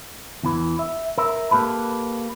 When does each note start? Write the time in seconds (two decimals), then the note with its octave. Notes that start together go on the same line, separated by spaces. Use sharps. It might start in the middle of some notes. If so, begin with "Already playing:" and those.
0.43 E2 E3
0.79 E5
1.18 A#4 E5
1.51 A#3 G4 A4 B4